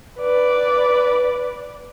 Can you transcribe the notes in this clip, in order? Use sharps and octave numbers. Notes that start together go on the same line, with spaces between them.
B4 D5